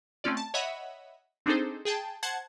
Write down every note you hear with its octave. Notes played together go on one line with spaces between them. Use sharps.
A3 C4 C#4 F4 D5
A5
C#5 D#5 E5 F#5 B5
C4 D4 D#4 G#4 A4 C5
G#4 G5 A5
C5 F#5 A5 G#6